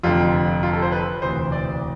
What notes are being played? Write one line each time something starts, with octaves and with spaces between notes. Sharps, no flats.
F1 F2 D3 F4
F4
A4
C5
B4
E1 D2 C3 E3 C5
D5